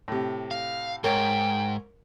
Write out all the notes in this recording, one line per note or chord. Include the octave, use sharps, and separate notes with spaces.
A2 C3
F5
G#2 A#4 C#5 G5